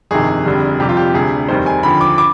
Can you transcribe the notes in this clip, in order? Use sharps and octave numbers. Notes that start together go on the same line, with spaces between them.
G1 F2 C3 D#3 G#4
F1 F2 D3 G3
F2 C3 G3 G4
F4
G4
D2 C3 G3 G#4
F1 D#2 D#3 G3 C5
G#5
D#2 D3 F3 B5
D6
D6